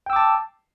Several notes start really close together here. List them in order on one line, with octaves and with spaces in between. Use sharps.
G5 E6 D6 A5